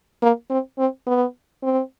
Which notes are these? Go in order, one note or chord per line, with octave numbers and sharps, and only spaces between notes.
A#3
C4
C4
B3
C4